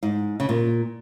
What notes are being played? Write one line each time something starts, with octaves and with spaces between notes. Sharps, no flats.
G#2
C#3
A#2